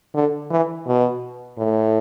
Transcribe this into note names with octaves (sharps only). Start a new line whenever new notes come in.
D3
E3
B2
A2